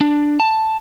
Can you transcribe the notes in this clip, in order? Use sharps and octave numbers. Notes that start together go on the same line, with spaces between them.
D4
A5